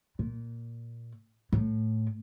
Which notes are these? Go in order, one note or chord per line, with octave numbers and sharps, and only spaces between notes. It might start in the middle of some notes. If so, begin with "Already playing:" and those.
A#2
A2